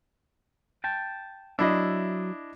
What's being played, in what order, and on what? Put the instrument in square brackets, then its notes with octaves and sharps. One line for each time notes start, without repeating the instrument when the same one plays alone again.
[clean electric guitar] G5 A5
[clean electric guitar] F#3 E5 [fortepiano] D4 E4 D#5